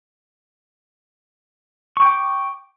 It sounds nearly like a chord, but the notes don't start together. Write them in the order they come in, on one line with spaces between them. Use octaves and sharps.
C#6 G5 D6